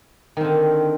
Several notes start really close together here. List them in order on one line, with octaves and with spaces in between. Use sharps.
D#3 C4 D3